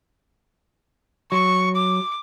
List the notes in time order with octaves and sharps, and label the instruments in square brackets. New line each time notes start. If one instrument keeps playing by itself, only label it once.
[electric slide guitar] F#3 [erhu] C#6
[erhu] D6